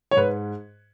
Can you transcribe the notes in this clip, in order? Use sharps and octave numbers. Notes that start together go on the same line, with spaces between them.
C#5
G#2 B4